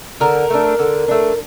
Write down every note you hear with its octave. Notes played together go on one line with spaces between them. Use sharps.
D3 A#4
A3 D4
D3
A3 D4